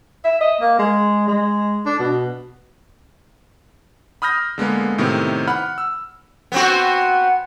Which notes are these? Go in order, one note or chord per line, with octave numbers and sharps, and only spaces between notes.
E5
D#5
A#3
G#3
G#3
D4
B2
B5 D#6 F6 G6 A#6
D3 G#3 A#3 B3
A2 C3 D#3 B3 C4
F#5 B5 F6
E6
B3 C4 F#4